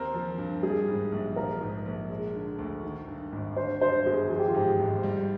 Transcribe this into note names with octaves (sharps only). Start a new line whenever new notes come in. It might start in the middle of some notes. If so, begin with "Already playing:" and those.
Already playing: D#2 C4 A#4
F3
G2
G3 G#4
G#2
A#1
F3 A#4
G#2
A#1
G#3
D3
D2
D#3
G2
G#1
D3 C5
G2 C5
G1 G#4
F3 G#4
G4
F4
G#2 G4
G#1
G3